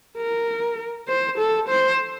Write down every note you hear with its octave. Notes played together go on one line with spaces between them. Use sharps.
A#4
C5
A4
C5